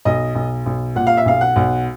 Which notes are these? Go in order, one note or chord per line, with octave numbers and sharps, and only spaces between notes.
B1 D#5
B1
B1
A#2 F#5
F5
E5
B1 F5
F#5
B1